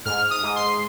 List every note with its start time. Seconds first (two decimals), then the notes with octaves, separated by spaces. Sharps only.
0.05 G#2 F6
0.30 D#6
0.43 G#2
0.56 C6